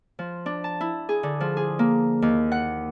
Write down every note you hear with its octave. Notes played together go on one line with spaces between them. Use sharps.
F3
D4
A5
E4
G#4
D3
F3
G#4
A#3
D#2
F#5